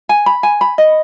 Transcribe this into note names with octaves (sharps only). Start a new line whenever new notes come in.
G#5
B5
G#5
B5
D#5